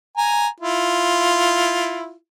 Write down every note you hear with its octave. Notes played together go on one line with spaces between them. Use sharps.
G#5 A#5
E4 F4